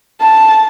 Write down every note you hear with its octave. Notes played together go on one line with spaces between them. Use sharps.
A5